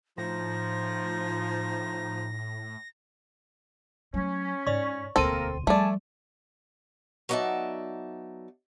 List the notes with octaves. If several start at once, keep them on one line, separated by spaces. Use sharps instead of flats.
A2 F3 D#4 A#6
F#3 A3 C#4
G#2 C#5 D5 C#6
E1 D2 A#3 C4 A4 A#4 C6 D#7
F3 G3 A3 G#4 D5 G#5 A5
F#3 B3 D#4 D5 E5 A5